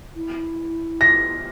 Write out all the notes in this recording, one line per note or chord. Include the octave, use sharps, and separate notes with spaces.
E4
A#6